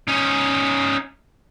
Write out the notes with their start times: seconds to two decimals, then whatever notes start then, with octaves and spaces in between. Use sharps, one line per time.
0.08 C#4 D#4